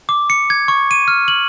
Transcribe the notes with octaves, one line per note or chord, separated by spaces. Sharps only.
D6
C#7
G#6
C#6
D#7
F6
F#7